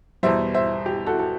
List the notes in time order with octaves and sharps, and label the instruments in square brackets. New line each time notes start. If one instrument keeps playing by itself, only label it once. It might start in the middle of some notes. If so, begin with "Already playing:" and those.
[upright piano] E2 B2 G3 C5 E5
C5 E5
G4
F#4 A4
A4